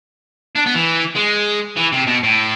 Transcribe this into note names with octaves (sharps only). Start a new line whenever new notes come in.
D4
B3
E3
G#3
E3
C3
B2
A2